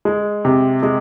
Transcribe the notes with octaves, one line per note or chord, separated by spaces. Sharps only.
G#3
C3
G#3